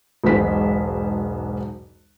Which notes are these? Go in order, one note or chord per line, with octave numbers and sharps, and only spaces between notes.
E1 B1 G#2 C5 B6